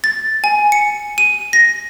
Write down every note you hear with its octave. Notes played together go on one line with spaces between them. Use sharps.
A6
G#5
C#7
D#7
A#6